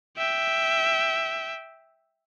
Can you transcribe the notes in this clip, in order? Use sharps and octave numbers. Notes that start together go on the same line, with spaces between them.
E5 G5